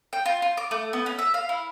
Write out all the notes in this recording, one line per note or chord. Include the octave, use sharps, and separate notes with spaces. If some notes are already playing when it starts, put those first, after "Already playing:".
G5
F4
F4
D6
A3
B3
C#4
E5
F5
E4